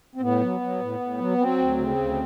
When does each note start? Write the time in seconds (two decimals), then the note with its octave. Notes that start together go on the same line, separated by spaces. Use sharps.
0.15 C4
0.21 A2 B3
0.41 F#3
0.60 F#3
0.80 A2
1.00 A2
1.18 F#3
1.38 F#3 C4
1.58 D2
1.77 C#3
1.96 D2